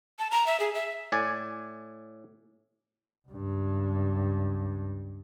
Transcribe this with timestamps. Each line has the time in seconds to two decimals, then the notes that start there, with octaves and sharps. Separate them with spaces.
0.19 A5
0.31 A#5
0.46 E5
0.60 G#4
0.74 E5
1.12 A2 D5 G#5
3.28 C#2 G2